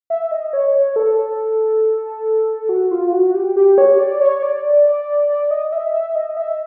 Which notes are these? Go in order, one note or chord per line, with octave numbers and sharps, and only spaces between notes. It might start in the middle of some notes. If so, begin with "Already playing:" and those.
E5
D#5
C#5
C#5
A4
F#4
F4
F#4
G4
G4
C#5
D5
C#5
D5
D5
D5
D#5
E5
E5
D#5
E5